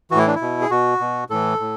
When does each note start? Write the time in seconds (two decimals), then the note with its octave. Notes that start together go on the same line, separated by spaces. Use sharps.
0.11 E3 F#4
0.14 A2 E4
0.27 D4
0.35 E4
0.41 B2
0.61 G#4
0.70 B2 F#4
1.00 B2
1.30 A2 E3 A4
1.60 A2